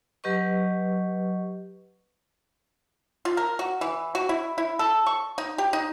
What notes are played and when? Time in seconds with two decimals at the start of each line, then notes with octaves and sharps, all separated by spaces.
0.24 F#3 G4 B4 D#5 C#6
3.25 F4
3.37 A#4
3.59 F#4
3.81 E3
4.15 F#4
4.29 E4
4.58 E4
4.79 A4
5.06 C#6
5.38 D#4
5.58 G4
5.73 D#4